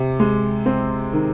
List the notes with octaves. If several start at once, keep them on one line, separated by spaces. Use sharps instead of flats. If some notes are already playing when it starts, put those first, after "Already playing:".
Already playing: C3
G#3
C4
D#3